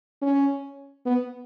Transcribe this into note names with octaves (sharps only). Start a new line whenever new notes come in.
C#4
B3